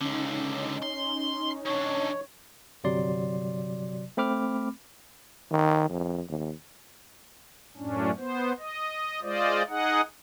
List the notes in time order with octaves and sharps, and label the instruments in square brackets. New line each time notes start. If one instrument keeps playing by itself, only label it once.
[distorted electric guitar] C#2 D3 [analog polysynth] C#4 D#4
[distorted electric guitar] C6
[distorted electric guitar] D#3 D4 [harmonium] C#5
[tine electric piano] G1 C3 F#3 D5 C6
A3 C4 B5 D6 F6
[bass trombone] D#3
F2
D#2
[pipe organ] F#2 A2 C#4 D4
B3 C5
D#5
G#3 F4 C5 D5 D#5
D#4 G#4 D#5 F#5